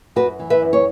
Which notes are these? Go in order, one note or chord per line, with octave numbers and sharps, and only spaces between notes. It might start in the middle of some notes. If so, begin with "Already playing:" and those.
F#2 F#4 B4
E3
B4 E5
F#2
C#5